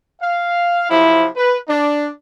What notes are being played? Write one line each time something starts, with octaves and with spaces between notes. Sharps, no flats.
F5
C3 F3 F#3 E4
B4
D4